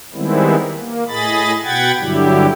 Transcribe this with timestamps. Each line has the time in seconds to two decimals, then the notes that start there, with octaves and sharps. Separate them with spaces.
0.14 D#3 G3 G#3 B3 C4 E4
0.77 A#3
1.08 A2 G#4 D#5 B5 A6
1.64 B2 F#5 G5 B5 G#6 A6
2.00 G2 D3 F#3 G3 E4 G4